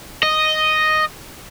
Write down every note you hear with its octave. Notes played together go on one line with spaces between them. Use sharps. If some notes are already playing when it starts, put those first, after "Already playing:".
D#5